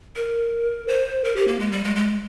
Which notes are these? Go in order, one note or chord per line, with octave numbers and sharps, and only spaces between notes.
A#4
C5
A#4
G4
A#3
G#3
G3
G#3
G#3